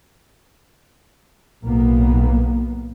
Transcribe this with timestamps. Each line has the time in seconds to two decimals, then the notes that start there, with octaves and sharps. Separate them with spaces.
1.62 B1 A2 A#3 B3